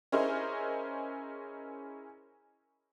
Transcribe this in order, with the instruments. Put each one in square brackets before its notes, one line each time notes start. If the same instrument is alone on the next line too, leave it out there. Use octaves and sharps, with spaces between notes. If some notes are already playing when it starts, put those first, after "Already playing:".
[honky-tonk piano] C#4 E4 G#4 A#4 C5 D#5